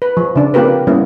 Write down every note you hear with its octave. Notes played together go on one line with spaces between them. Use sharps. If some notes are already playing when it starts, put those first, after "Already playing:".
B4
F3
C#3 D4
A#3 C4 F4 G4 A#4 B4
G3 A#3 B3 C#4 E4